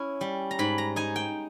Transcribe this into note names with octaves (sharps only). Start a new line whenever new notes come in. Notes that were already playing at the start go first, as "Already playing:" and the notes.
Already playing: C#4 E4
G3
A#5
G#2 B5
A#5
D#4 G#5
G5